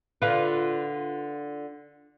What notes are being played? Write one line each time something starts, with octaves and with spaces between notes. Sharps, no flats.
D3 F4 B4